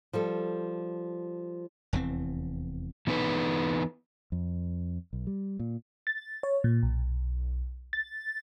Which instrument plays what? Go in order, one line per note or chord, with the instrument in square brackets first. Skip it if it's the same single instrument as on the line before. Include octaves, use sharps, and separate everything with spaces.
[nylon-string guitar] F3 G3 A4
[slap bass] F1 E2 E3 C4
[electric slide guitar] E3 B3 D#4 B4
[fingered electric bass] F2
B1
G3
A#2
[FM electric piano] A6
C#5
A#2
B1
A6